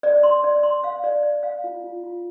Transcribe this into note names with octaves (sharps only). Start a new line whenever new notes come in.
D5
C6
D5
C6
F5
D5
D5
F5
F4
F4
F4